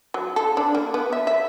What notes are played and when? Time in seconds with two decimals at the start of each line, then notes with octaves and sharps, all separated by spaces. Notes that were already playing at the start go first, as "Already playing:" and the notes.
0.14 F#3
0.36 A4
0.57 D4
0.75 A#3
0.94 B3
1.13 E5
1.27 E5